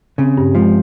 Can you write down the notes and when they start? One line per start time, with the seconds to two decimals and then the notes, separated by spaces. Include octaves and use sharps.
0.18 C#3 C4
0.38 G2
0.55 F3 G#3